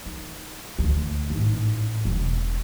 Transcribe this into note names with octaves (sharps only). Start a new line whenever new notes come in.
D#4
D2
A1 G#2
E1